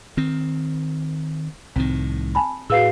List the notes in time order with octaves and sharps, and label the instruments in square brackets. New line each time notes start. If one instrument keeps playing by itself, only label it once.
[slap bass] D#3 C4
[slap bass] C2 A2 D#3 [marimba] C4
[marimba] G#5 A5 B5
[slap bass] A2 [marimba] F#4 B4 E6 [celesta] G#4 F5 C7